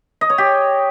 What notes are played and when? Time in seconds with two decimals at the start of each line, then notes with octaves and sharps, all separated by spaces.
0.21 D#5
0.30 C#5
0.38 G4